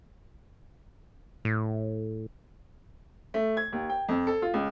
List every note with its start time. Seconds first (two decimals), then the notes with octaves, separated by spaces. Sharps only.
1.45 A2
3.34 A3
3.57 G#6
3.72 D#2
3.89 G5
4.09 F2
4.27 A4
4.42 F4
4.54 C#2